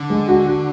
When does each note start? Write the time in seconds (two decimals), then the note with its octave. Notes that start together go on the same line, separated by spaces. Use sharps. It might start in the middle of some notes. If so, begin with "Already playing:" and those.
Already playing: D3
0.10 G#3
0.28 F#4
0.47 F#4